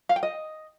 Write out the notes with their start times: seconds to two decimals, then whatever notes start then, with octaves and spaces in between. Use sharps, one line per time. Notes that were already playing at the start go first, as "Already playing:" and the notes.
0.09 F5
0.16 G5
0.23 D#5